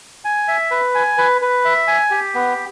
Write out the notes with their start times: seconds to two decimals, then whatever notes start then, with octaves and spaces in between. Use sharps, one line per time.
0.25 G#5
0.48 E5
0.71 B4
0.95 G#5
1.17 B4
1.41 B4
1.65 E5
1.88 G#5
2.10 G4
2.35 B3